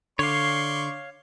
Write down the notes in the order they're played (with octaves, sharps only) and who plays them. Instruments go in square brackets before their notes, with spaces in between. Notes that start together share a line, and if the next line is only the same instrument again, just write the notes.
[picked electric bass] D3 [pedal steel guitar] C#5 F5 [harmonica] D5 C6 C#6